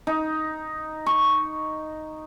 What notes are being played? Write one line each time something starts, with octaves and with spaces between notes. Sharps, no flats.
D#4
C#6